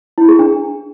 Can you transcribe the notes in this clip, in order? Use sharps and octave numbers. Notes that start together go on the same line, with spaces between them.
E4
G#4
D4